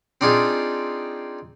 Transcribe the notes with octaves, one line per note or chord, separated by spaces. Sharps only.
C4 D4 D#4 F4 G#4